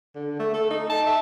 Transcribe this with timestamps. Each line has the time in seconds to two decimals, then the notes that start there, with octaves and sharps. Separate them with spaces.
0.15 D3
0.39 A3
0.54 A4
0.70 D#4
0.90 A5
1.06 E5